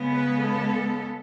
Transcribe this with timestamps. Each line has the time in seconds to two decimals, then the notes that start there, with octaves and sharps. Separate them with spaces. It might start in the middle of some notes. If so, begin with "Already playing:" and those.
Already playing: C#3 G#3 B3
0.12 B4
0.41 A4